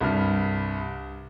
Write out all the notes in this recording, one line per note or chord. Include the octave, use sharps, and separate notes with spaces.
C2 G2 F6